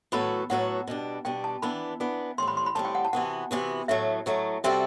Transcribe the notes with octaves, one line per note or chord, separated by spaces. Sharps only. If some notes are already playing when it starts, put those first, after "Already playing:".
A2 F#3 B3 F#4 A4 B5
A2 F#3 B3 F#4 A4 F#5
B2 G3 D4
B2 G3 D4 G5
A5
E3 B3 D4 B5
E3 B3 D4
A2 G3 C4 C6
B5
C6
B5
A2 G3 C4 A5
G5
F#5
A5
C3 E3 B3 F#4 F#5
C3 E3 B3 F#4
A2 F#3 A3 E5
A2 F#3 A3
C3 G3 C4 F#4 A4 E5